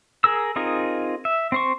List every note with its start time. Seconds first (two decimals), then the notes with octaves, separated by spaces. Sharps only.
0.24 G#4 A#4 E6
0.56 C4 D#4 F4 G#4 A#4
1.25 E5
1.52 C4 C5 C#6